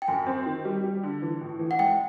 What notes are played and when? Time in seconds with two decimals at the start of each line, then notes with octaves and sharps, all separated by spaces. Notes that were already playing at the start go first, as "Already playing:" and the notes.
0.02 G5
0.08 F#2 G#5
0.27 C4
0.46 D#3
0.65 G3
0.83 G3
1.03 D3
1.22 E3
1.41 A2
1.59 E3
1.71 F#5
1.79 G#3 G5